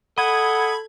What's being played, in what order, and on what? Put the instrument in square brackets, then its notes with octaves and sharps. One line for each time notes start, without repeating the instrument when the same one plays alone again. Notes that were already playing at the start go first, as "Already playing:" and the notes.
[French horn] A4 [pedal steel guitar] D#5 [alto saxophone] F#5 [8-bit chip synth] B5 G#6